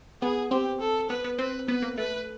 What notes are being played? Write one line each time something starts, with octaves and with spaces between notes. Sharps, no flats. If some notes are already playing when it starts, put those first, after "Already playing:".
B3 G#4
C4 G4
A4
B3 B4
B3
C4 B4
B3 B4
A#3
A3 B4